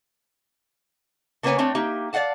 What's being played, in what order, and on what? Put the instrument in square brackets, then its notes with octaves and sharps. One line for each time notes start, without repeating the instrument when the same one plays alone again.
[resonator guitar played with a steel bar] C#3 A#3 B3 B4 C#5 G#5
A3 C4 D4 C#5
A#3 D#4 G4 E5
D5 D#5 F5 F#5 A5